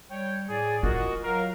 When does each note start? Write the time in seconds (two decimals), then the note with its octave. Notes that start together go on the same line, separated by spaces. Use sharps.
0.10 G3 C#5 G5
0.49 A2 G#4 D5
0.83 F4 F#4 A#4 D#5
1.23 F#3 A#4 F5